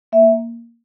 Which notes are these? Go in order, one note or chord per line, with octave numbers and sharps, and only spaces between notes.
A#3 E5